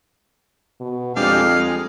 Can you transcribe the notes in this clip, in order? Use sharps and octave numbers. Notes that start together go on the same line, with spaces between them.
B2
F2 G#3 D4 G4 F5
G#3